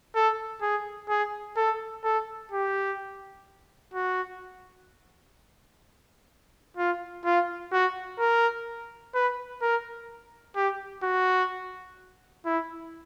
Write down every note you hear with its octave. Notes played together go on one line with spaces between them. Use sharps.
A4
G#4
G#4
A4
A4
G4
F#4
F4
F4
F#4
A#4
B4
A#4
G4
F#4
E4